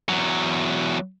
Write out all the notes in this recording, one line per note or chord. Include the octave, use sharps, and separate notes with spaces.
E2 F#3